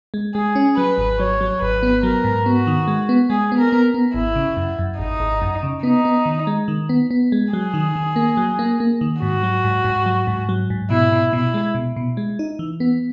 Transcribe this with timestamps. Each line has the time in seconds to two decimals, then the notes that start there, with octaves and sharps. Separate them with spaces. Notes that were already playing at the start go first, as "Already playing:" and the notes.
0.14 G#3
0.35 G#3 G#4
0.55 C#4
0.77 F#3 B4
0.98 G#1
1.19 F#3 C#5
1.41 F#3
1.62 G#1 B4
1.83 B3
2.03 F#3 A#4
2.24 G#2
2.46 B3 F#4
2.67 D#3
2.88 G#3
3.09 B3
3.30 G#3 G#4
3.52 B3
3.59 A#4
3.72 B3
3.94 B3
4.14 G#1 E4
4.36 C#3
4.57 F#2
4.79 F#2
4.99 G#1 D#4
5.20 G#1
5.42 F#2
5.63 C#3
5.83 B3 D#4
6.05 B3
6.26 D#3
6.47 G#3
6.68 D#3
6.89 B3
7.11 B3
7.32 G#3
7.53 F#3 G#4
7.74 D#3
7.96 D#3
8.16 A#3
8.37 F#3
8.59 A#3
8.80 A#3
9.01 D#3
9.22 G#2 F#4
9.43 F#3
9.64 G#2
9.85 G#2
10.06 F#3
10.27 G#2
10.49 F#3
10.70 G#2
10.90 B2 E4
11.13 B2
11.33 B2 E4
11.54 G#3
11.75 B2
11.96 B2
12.17 G#3
12.39 D#4
12.59 E3
12.80 B3